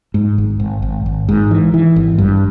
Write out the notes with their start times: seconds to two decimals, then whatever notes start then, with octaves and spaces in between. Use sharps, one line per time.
0.14 G#2
0.38 G#1
0.60 G#1
0.82 G#1
1.06 G#1
1.29 G#2
1.51 E3
1.74 E3
1.96 G#1
2.18 G2